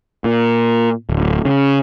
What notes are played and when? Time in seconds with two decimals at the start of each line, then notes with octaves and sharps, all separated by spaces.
0.24 A#2
1.10 D1
1.45 C#3